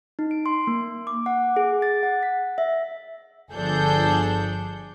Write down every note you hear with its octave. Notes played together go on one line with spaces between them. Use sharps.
D#4
D7
C6
A#3
D6
F#5
G#4
A6
F#5
B6
E5
G1 F3 D4 G#4 A4 G6